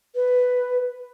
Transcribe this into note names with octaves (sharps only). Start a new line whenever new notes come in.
B4